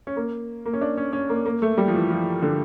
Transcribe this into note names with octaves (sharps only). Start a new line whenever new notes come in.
C#4
A#3
A#3
C#4
D4
C#4
C#4
A#3
A#3
A3
G3
F3
E3
F3
D3